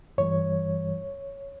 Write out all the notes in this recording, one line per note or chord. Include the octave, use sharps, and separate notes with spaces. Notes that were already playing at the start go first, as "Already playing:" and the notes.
G2 E3 G3 C#5